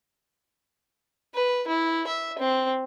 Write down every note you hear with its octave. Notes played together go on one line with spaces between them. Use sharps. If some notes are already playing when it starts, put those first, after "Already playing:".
B4
E4
E5
C4